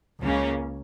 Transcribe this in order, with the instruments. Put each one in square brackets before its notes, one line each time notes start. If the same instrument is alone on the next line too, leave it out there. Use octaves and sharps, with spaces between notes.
[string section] C#2 C#3 A#3 C#4